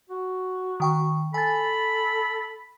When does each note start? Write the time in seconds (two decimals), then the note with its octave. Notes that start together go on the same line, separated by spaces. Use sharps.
0.10 F#4
0.80 D#3 G5 C#6
1.34 A4 G#5 B5 A6